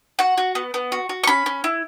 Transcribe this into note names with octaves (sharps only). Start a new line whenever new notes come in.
F#4 F#5
F#4
B3
B3
F#4
F#4
C#6
C#4 B5
C#4
E4